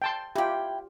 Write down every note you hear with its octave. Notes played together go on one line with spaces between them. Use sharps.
G5 A5 C6
E4 F4 G4 G5